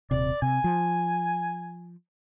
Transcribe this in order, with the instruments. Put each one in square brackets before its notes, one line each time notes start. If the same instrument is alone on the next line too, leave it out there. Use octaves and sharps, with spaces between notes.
[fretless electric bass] D#1 C3 [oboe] D5
[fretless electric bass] C3 [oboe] G#5
[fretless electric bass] F3